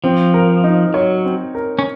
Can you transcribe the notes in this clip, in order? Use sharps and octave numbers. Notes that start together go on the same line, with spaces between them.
F3 C4
A#4
D#4
F#3 C#5
C4
A#4
C#4